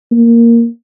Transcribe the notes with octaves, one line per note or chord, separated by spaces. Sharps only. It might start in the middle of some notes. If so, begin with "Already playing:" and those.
A#3